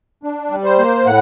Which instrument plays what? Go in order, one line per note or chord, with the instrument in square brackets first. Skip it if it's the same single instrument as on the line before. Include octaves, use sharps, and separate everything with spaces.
[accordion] D4
G3
C5
A#3
A2 F#5